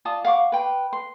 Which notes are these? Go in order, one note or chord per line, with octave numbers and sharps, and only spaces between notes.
F4 D5 A5 D#6
F5 F#5 C#6 D6
B4 G5 C6
C6